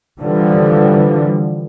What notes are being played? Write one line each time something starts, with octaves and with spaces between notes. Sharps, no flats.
D3 E3 F3 G3